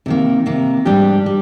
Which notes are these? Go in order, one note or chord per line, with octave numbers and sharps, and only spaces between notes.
C3 D#3 A#3
C3 D#3 A#3
G#2 G3 D4 G4
G3